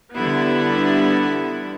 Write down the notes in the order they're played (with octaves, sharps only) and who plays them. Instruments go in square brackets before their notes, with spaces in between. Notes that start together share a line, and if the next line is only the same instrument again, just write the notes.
[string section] D3 G3 B3 E4